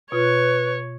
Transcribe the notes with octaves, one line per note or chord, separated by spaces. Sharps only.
B2 F4 B4 C#5